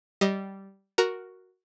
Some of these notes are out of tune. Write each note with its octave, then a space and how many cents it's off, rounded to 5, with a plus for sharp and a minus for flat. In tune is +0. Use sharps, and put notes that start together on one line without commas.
G3 -10 D#5 +0
F#4 +0 A#4 +0